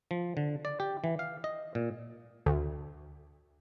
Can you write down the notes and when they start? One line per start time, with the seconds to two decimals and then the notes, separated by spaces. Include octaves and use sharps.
0.11 F3
0.37 D3
0.65 D5
0.80 G4
1.04 E3
1.19 F5
1.44 D#5
1.75 A#2
2.46 D2